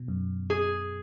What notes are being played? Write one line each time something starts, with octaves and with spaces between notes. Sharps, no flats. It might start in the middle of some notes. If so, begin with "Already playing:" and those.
Already playing: B2
F#2
G#4